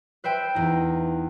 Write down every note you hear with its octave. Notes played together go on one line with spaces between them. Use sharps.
B4 C5 E5 G5
E2 D#4